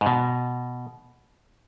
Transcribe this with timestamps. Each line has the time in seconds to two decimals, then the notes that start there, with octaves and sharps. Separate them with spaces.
0.01 G#2
0.06 B2